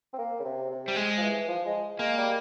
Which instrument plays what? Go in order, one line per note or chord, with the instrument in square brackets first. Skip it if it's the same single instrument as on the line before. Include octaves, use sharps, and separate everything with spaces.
[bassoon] C4
A#3
C#3
C3
C3
[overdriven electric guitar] G3
G#3
[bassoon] F3
E3
F3
G#3
[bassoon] G#3 [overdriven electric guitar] A#3
[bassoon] G3